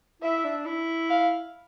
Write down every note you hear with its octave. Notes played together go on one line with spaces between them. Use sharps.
E4 E5
D4
E4
F5